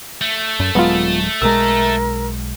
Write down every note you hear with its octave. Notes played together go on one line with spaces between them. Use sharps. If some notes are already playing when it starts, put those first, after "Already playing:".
A3
F#2
D#1 F#3 G#3 B3 F4
B1 G#3 A#4 E6